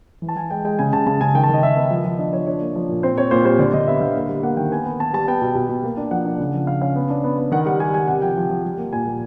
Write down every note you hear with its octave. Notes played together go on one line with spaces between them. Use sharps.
E3
A5
E3 G#5
G#3 G5
G#3 G5
C#3 G#5
C#3 A5
C#3 A5
C#3 G#5
D#3 G5
A5
D#3 D#5
D#3 E5
B3
F3
F3
D4 D#5
F3 C#5
D4 C#5
A#3
F3
A#2
C4 C5
C4 C#5
A#2 C5
G3 C5
D3 D5
D3 D#5
B3 E5
D3 F5
A#3
G3
A#3 F#5
D#3 G5
B3 G#5
B3
B3 A5
G3 A5
B3 G5
B2
B2
B2
A#3
D4
F3 F#5
D4
C#3
F3
C#3 F5
C#4 F5
B3
D4
B3
B3
D#3 F#5
G3 F#5
G3 G#5
G3 G#5
C3 F#5
F3 G5
F3
F3
G3
A#3
A#2 G#5
G3